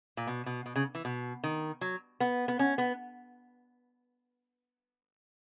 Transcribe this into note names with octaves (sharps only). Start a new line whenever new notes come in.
A#2
B2
B2
B2
C#3
E3
B2
D#3
F#3
B3
B3
C#4
B3